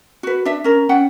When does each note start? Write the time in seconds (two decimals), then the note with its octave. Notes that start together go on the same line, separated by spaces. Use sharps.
0.23 F#4 B4
0.45 D4 E5
0.64 C#4 A#4
0.89 C#4 F#5 G5